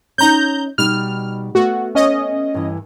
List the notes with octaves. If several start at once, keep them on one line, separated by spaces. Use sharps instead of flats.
C#4 D#4 A#5 G6
B2 G3 D#4 F6
A3 B3 F#4
C#4 D#5
G2 E3